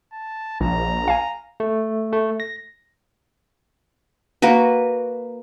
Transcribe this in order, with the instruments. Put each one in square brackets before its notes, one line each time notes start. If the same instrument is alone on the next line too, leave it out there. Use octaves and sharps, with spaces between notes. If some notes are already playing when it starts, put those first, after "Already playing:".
[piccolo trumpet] A5
[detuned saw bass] A#1 [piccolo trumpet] A#5
[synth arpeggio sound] F5 G#5
[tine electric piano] A3
A3
A#6
[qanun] A#3 F#4 A#4 B4